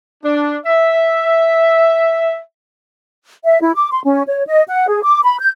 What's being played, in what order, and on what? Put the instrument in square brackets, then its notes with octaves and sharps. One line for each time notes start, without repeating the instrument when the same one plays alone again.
[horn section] D4
E5
[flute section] E5
E4
D6
C6
C#4
C#5
D#5
F#5
G#4
D6
B5
G6